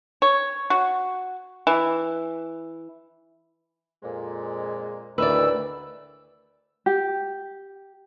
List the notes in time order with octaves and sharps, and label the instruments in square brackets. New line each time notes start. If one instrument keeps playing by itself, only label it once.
[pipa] C#5
F#4
E3
[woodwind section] F2 A#2 G#3
[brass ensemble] D2 A2 E3 [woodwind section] D#3 [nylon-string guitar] B4 D5 [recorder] E6
[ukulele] G4